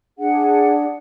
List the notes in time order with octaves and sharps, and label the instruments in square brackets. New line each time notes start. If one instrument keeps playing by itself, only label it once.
[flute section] D4 G#4 F#5